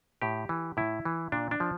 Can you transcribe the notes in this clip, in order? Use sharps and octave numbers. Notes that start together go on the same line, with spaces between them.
A2 G4
E3
A2 E4
E3
A#2 D4
D4
F3